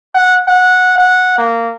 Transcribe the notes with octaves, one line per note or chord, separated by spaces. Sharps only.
F#5
F#5
F#5
A#3